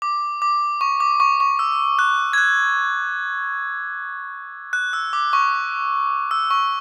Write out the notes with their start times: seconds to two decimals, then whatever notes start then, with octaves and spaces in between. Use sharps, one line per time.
0.02 D6
0.42 D6
0.81 C#6
1.00 D6
1.20 C#6
1.40 C#6
1.59 E6
1.99 F#6
2.33 G#6
2.38 F#6
4.73 F#6
4.93 E6
5.13 D6
5.33 C#6
6.31 E6
6.51 C#6